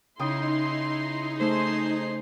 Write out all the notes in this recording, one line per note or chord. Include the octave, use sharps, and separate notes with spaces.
C#3 D#4 E4 G5 C6 D#6
A3 G#4 C5 C6